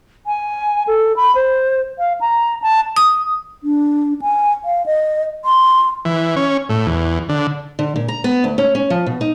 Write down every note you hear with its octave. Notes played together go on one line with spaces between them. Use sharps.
G#5
A4
B5
C5
F5
A#5
A5
D#6
D4
G#5
F5
D#5
C6
E3
C#4
A2
E2
D3
D3
A#2
A#5
B3
D2
C#4
C#4
F3
B2
D#4